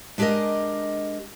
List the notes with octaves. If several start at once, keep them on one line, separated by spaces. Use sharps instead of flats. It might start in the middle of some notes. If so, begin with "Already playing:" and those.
G#3 D4 G4 G#4 A#4 D#5